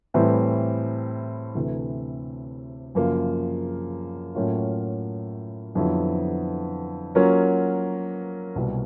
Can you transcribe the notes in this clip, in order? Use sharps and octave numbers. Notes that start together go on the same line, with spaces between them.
A2 E3 G3 C4 E4
D2 C3 E3 A3
F#2 C#3 F3 A#3
A2 F#3 A#3 C#4 F4
F2 D3 F#3 B3 E4
F#3 A#3 C#4 F4 A#4
C2 B2 G3 A#3